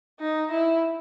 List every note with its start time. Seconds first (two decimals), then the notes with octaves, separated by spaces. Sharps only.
0.20 D#4
0.51 E4